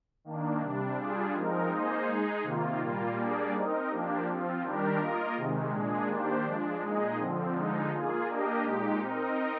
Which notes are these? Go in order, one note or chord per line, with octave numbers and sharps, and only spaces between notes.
D#3 A#3 D4
C3 G3 D4
G3 D4 F4 G#4
F3 G#3 C4 D#4 A#4
A#3 D#4 G#4 C5 D#5
G#3 D#4 G#4
C3 D#3 A#3 F4
A#2 G3 A#3 F4
G3 A#3 D4 G#4 D5
C4 D#4 A#4 D#5
F3 A#3 D4 G4
F3 C4 F4
D#3 G3 D4 G4 A#4
A#3 F4 A#4 D#5
C3 D#3 G#3
A#2 G#3 D4 G#4
D#3 A#3 D4 G4 C5
F3 G#3 D4
A#2 G#3 D#4 G#4 D#5
D3 F3 C4
D3 F3 G#3 D#4
A#3 F4 G#4
A#3 D4 G4 A#4 D#5
A#2 G#3 D#4 G4
C4 D#4 A#4 D#5